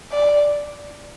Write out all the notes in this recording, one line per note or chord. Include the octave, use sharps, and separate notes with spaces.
D5